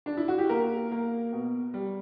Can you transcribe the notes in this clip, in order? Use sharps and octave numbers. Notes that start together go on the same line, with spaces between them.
D4
E4
F#4
G4
A#3 A#4
A#3
B2
G3